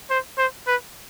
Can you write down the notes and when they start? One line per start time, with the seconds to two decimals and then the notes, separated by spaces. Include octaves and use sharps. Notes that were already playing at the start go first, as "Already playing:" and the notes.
0.10 C5
0.38 C5
0.67 B4